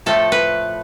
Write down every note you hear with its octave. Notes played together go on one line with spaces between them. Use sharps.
A2 F3 A3 A4
B4